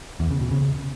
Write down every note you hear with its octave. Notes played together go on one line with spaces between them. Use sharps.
E2
C#3
B2
C#3